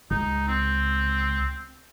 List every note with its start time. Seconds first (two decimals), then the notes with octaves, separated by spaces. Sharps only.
0.11 C#2 D#4
0.48 C4